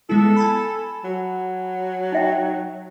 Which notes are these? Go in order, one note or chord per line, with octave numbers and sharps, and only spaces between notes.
G#3 B3 E4 A4
G#5 A5 B5
F#3
D#4 E5 G5